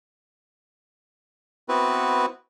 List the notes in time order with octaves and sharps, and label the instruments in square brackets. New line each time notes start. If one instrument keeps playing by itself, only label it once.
[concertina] B3 C4 E4 F#4 B4